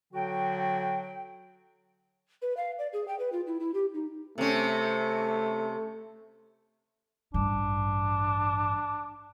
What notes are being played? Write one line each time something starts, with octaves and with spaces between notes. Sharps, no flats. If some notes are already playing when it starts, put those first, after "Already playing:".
D3 F#3 F#4 G5
B4
F5
D5
G#4
G5
B4
F4
E4
E4
G4
D#4
C3 A3 C#4
A1 G2 D4